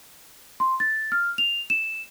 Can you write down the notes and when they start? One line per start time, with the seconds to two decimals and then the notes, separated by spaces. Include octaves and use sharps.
0.60 C6
0.80 A6
1.12 F6
1.38 F7
1.70 E7